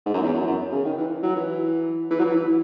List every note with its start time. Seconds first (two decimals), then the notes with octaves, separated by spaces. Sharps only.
0.06 G#2
0.14 F#2
0.22 E2
0.34 F#2
0.47 F#2
0.72 C#3
0.85 D#3
0.98 E3
1.23 F#3
1.36 E3
2.11 E3
2.20 F#3
2.24 E3
2.36 E3